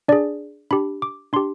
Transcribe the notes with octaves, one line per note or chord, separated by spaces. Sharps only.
D4 G#4 D5
D4 G4 B5
D6
D4 G4 C6